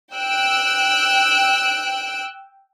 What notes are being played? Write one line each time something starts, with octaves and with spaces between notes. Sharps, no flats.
G5 E6 F#6 D7